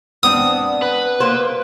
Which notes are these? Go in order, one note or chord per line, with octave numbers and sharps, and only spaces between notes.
B3 C4 D4 D#6
B4
A#3 C5